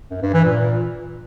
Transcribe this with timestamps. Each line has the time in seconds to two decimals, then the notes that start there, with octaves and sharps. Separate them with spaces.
0.11 F#2
0.22 G2
0.33 E3
0.45 A#2